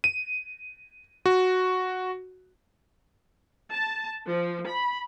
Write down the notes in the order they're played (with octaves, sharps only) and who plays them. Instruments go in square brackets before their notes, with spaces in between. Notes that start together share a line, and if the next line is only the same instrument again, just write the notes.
[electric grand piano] D#7
F#4
[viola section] A5
F3
B5